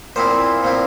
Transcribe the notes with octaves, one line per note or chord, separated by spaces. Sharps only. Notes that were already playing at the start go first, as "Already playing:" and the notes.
A#2 F3 C4 E4 C5
A#2 F3 C4 E4